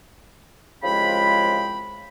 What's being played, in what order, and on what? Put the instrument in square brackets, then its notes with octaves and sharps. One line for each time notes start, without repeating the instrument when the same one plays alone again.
[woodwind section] C2 C#3 F3 G#3 G5 B5